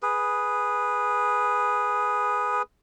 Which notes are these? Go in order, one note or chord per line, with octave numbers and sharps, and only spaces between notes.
G#4 B4